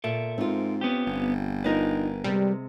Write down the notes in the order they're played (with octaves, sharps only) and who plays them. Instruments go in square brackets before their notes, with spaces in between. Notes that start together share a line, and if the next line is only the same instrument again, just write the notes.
[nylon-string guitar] A#2 [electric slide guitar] A4 A#4 E5
[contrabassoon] G#2 [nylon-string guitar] C4 F4
[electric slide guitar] B3 C#4 G4
[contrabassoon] G1
[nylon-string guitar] D4 D#4 F4 [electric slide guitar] A#4 B4
[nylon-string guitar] C3 G#3 [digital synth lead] G3